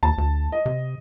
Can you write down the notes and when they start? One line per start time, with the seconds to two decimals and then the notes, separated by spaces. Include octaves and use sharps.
0.03 D#2 A5
0.18 D2
0.52 D#5
0.66 C3